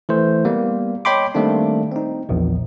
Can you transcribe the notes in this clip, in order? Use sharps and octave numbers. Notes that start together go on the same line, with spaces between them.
E3 A3 C5
G3 A#3 B3
C#5 D#5 G5 B5 C6 D6
D#3 G3 A3 A#3 C4 D4
C4 D#4
A#1 E2